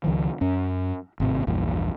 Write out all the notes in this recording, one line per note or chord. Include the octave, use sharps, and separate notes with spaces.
C#2 D#3 F3
F#2 C#4
G#1 A2 C3
A#1 E2 G2 A#2